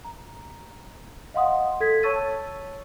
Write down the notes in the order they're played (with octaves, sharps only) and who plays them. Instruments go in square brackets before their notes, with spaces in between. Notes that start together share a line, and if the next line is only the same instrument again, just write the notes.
[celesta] A#5
D#5 F5 F#5 C6 D#6
A4 G#6 B6
C#5 A5 C#6 E6 A6 D#7